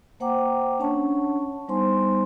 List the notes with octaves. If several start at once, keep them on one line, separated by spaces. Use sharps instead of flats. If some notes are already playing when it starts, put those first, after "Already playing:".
A#3 C5 F#5 G5 A#5 D6
C#4 D4 C#5 F#5 A5 C#6
G3 B3 D#4 C5 G#5 C6